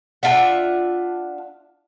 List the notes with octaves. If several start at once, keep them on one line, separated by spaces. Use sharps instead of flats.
D4 F4 E5 F#5